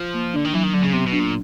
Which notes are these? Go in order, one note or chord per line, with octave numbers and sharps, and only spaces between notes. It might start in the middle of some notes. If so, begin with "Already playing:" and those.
Already playing: F3
A#3
D3 D4
D#3
E3 F#3
D#3
D3 F#3
C#3
C3 B3
B2
D4
A#2